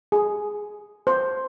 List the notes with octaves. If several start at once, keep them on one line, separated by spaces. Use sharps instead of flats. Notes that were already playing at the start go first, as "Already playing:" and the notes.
G#4
C5